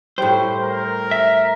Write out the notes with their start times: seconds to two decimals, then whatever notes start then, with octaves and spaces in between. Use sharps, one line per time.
0.18 A2 G3 C5
0.62 A#4
1.11 E5